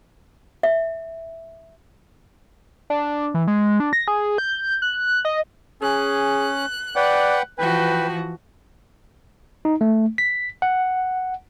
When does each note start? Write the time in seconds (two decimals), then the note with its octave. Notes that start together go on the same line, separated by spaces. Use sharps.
0.63 E5
2.90 D4
3.34 E3
3.48 G#3
3.80 D4
3.93 A#6
4.08 G#4
4.38 G6
4.82 F#6
5.25 D#5
5.82 C#4 G#4 F#6
6.96 B4 D5 F#5 G5
7.58 E3 F3 F#4 B4 G5
9.65 D#4
9.81 A3
10.18 B6
10.62 F#5